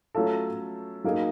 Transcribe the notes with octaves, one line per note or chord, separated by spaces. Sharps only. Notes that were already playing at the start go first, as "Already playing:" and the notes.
F#3 A3 C#4 F4 A4
F#3 A#3 D#4 G#4